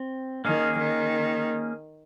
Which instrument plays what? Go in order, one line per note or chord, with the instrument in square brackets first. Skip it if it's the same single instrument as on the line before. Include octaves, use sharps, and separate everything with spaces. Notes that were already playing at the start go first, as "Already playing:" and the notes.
Already playing: [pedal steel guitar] C4
[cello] D#3 [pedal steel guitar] A#3 C#4 G#4
[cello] D#3